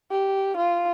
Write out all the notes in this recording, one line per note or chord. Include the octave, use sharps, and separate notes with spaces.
G4
F4